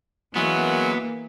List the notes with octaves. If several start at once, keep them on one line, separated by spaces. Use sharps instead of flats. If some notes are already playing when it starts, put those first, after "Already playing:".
E3 F#3 G#3 A#3 B3 C#4 G#4